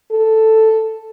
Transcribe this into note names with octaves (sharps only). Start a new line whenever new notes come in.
A4